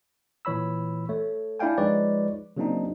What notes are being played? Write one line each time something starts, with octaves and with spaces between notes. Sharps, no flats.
A#2 E3 C#5 B5 E6
A3 C#5
D4 E4 D5 F5 G5 G#5
F3 G#3 D#4 B4 C#5 D5
C#3 F#3 A#3 C4 D4 D#4